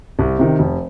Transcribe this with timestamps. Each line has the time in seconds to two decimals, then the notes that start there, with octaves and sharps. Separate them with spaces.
0.19 C2
0.39 C3 D#3
0.59 F1